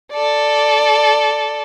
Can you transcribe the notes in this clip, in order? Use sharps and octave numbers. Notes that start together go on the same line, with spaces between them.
A4 D5